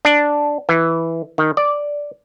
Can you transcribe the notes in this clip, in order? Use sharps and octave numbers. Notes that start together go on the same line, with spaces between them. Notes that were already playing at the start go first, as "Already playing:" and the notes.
D4
E3
D#3
D5